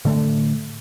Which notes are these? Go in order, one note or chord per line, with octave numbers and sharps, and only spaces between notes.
A2 D3 A3